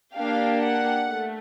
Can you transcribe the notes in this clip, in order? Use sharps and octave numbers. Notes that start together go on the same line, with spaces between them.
A#3 D4 G4 F5
F#5
A3